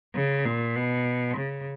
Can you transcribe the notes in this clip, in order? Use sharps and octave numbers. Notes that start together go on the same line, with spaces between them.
C#3
A#2
B2
C#3